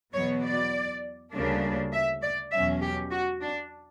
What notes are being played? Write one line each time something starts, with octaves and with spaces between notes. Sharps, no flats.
E2 B2 F#3 B3 C#5
D5
D2 C#3 G3 A#3 D4
E5
D5
E2 B2 F#3 C#4 E5
G4
F#4
D4